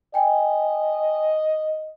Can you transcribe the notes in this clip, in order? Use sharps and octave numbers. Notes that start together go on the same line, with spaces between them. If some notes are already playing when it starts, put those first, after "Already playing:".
D#5 G5 G#5